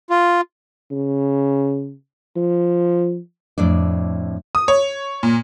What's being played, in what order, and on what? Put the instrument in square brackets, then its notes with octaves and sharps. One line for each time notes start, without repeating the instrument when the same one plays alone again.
[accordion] F4
[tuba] C#3
F3
[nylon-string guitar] F2 A2 D4 D5
[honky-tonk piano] D#6
C#5
A#2